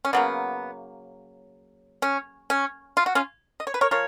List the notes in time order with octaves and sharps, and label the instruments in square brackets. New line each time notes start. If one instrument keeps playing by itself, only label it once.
[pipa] C#4
C#3 F#3 A#3 B3
C#4
C#4
F4
F#4
C#4 F4
D#5
C#5
B4
A#4 C#5
F3 A#4 C#5